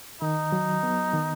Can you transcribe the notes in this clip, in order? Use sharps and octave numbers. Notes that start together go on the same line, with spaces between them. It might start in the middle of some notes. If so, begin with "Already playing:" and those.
D#3 D#4
F#3
B3
D#3